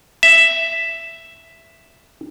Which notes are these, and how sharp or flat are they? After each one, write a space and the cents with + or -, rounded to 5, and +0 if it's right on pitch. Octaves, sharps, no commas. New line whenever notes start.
E5 +5